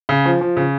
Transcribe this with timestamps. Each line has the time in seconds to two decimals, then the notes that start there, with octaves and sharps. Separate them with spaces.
0.09 C#3
0.25 F3
0.41 F3
0.57 C#3